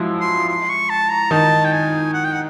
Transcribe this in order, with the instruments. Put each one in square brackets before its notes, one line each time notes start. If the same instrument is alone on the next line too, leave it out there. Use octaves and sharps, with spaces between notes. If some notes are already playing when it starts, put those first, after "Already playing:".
Already playing: [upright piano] F3 F#3 G#3 E4
[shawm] C6
C6
C#6
A5
A#5
[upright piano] D#3 D#4 [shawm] A5
[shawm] G5
G#5
F#5
G5
F#5